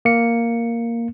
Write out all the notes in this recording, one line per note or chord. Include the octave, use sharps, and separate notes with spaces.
A#3 C#7